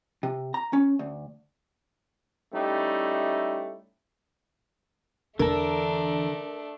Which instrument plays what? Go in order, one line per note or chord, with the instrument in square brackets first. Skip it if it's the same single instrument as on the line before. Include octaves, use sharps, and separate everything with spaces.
[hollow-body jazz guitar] C3
A#5
C#4
D2
[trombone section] G3 A3 C#4 D#4 E4 G4
[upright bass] E2 E3 [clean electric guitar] D3 A4 [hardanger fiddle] A3 D4 [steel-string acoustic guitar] A#4